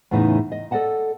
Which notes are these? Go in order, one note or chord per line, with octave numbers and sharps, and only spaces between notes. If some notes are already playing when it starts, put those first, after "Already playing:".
E2 A2 C#3 E3 D#4 E4
D#5
A4 D5 D#5 F#5 A5